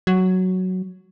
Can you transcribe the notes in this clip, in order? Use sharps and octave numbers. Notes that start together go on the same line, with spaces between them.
F#3